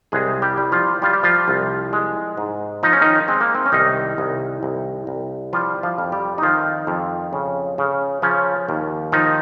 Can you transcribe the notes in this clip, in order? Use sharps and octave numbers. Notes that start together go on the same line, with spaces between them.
C2 G#3 G#4
G3 G4
G3
F3 F4
G3 F4
G4
F3 F4
C2
G#3
G#2
F3 D#4
C#4
D#3 D#4
G#3 C4
A#3
C4
C#4
C2 D#3 D#4
C2
C2
C2
F3 G3 F4
F3 F4
F2
G3 G4
D#4
D#3 F3 F4
F2
C#3
C#3
C#3 F3 C#4
D#2
D#3 F3 D#4